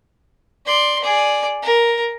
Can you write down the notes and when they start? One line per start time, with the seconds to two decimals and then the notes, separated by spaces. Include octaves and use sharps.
0.66 D5 C6
1.02 G#4 D5
1.62 A#4